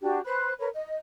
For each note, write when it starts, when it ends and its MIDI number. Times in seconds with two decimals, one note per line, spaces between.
0.02 0.19 62
0.02 0.19 66
0.02 0.19 67
0.25 0.52 71
0.25 0.52 72
0.25 0.52 83
0.25 0.52 90
0.58 0.68 70
0.58 0.68 71
0.58 0.68 73
0.74 0.97 75